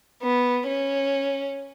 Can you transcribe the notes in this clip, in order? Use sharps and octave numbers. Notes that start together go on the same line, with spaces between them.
B3
C#4